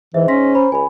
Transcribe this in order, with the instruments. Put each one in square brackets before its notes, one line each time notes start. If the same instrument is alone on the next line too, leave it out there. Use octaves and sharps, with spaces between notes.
[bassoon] G#2 [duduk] E3 [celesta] E5
[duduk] C#4 [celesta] C6 A#6 B6
[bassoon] C5 [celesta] A#5 B5
[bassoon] C#2 [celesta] G#5 B5